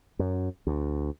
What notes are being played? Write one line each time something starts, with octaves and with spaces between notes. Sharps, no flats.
F#2
D2